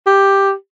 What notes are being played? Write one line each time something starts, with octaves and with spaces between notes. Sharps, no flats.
G4